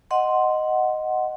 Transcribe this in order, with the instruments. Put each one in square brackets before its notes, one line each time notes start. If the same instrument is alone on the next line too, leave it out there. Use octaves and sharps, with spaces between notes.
[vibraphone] D#5 F#5 C6